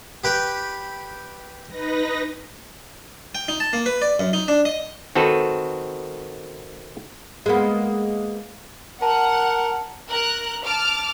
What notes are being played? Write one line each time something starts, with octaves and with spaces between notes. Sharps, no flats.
G4 B4 G5
D#4 B4 A#6
G5
D#4
A5
A#3
B4
D5
F#2
D#4
D4
D#5
D#3 C4 F#4 A4 B4
G#3 A#3 B3
A#4 F#5 A5
A#4 F#6
A5 D6 F6